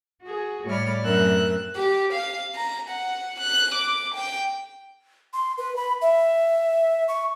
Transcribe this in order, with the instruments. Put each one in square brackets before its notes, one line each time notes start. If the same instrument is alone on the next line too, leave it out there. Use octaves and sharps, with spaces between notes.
[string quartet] F#4 G#4
A2 G3 C#5 D5 B5 F6
F#2 A3 C4 A#4 E6 F#6
[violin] G4
F5
A#5
F#5
F#6
D6
G5
[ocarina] C6
B4
B5
E5
C#6